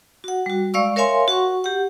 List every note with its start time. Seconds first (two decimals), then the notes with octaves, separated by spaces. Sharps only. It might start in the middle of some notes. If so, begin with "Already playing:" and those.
0.24 F#4 F#5
0.46 G3 F#4
0.74 G#3 D5 F5 C#6 E6
0.96 A#4 C#5 E5 F5 G#5 C6
1.28 F#4 F#5 C#6
1.64 G4 F#5